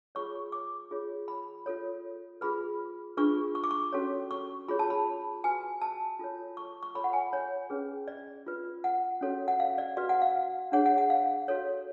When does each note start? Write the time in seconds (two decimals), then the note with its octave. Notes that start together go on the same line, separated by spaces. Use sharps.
0.15 F4 G#4 C#5 C#6
0.52 D6
0.91 F4 G#4 C#5
1.28 B5
1.66 F4 A4 C#5
2.41 F4 G#4 B4 B5
3.17 D4 F4 G#4 B4 C#6
3.55 C#6
3.64 D6
3.71 C#6
3.93 C#4 F#4 A4 C#5
4.31 C#6
4.68 F4 G#4 C#5 B5
4.79 A5
4.90 B5
5.44 F#4 B4 G#5
5.81 A5
6.19 F4 A4 C#5
6.57 C#6
6.83 C#6
6.95 F4 A4 C#5 B5
7.04 F#5
7.13 G#5
7.33 C#5
7.70 C#4 G#4 B4
8.08 D5
8.47 F4 B4
8.84 F#5
9.21 C#4 F#4 A4 C#5
9.48 F#5
9.60 F5
9.78 D5
9.97 F#4 B4 D5
10.09 F#5
10.22 F5
10.72 D4 G#4 C#5 F#5
10.86 F#5
10.98 F#5
11.10 F5
11.48 F#4 A4 C#5